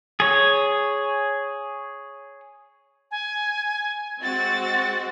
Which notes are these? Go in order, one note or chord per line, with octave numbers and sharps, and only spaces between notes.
G#4 C#5
G#5
G#3 C4 F#4 A6